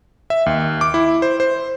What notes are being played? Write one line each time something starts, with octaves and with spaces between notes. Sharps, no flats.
E5
D#2
D6
E4
C5
C5